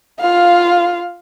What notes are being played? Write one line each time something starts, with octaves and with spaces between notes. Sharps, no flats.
F4 F5